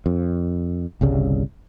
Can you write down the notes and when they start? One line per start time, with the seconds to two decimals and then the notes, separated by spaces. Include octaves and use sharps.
0.06 F2
1.01 G1 C2 C#3 G3